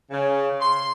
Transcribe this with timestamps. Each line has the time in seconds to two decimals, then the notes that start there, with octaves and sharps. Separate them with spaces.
0.11 C#3
0.60 C6